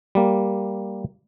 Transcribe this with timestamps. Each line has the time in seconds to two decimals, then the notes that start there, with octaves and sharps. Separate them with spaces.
0.15 G3 A#3